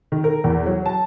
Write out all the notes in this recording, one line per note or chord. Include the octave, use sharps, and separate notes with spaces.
D#3
A#4
E2
F#3
A5